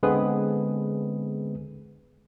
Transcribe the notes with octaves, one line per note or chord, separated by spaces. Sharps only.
D3 G#3 B3 C4 G#4 B4